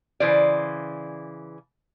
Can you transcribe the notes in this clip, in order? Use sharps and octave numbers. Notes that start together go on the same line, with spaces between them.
C#3 E3 C5 D5